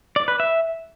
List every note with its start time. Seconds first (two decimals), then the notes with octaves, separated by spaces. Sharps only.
0.16 D5
0.28 B4
0.40 E5